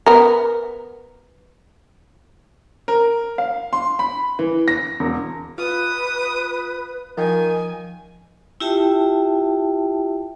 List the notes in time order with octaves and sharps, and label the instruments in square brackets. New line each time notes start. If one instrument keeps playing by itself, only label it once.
[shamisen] B3 A#4
[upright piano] A#4
F5
C6
B5
E3
A#6
E1
[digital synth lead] F4 [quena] B4 [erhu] D#6
[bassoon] D#3 [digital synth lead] F3 [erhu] G#5
[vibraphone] E4 F4 G4 E5 G5 A5